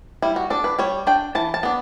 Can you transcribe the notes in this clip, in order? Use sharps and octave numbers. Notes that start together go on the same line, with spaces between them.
G3 E4
F#4
D4 A4
B4
G3 C#5
D4 G5
E3 A5
A5
B3 D4